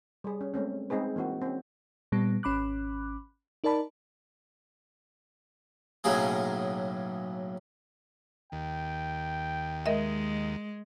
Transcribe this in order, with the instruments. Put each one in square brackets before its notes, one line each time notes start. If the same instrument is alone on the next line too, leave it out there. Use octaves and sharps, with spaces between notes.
[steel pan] G3 G#4
C#4
G#3 A3 C4 C#4
G#3 C4 D#4 G#4 B4
E3 A#3 C4 F#4
C4 C#4
[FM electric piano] A#2 G3 B3
G#1 C#4 B5 D6 F#6
D#4 A#4 D5 A5 B5
[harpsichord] B1 A2 C#3 F#3 A#3 G#4
[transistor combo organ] D#2 [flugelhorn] G5
[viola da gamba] G#3 [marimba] A#4 D#5 E5